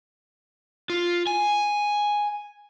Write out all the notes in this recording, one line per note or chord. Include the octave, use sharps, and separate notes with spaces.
F4
G#5